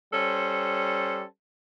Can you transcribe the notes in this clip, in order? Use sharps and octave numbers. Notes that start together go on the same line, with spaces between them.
G3 C#4 A4 C5